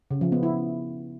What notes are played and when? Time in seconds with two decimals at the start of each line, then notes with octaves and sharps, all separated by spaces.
0.11 C#3
0.21 F3
0.32 B3
0.43 E4